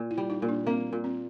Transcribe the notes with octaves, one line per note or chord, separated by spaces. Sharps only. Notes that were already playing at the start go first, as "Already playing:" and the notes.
Already playing: A#2
E4
G3
D#4
A#2
D4
A#3 C4
A#2
C4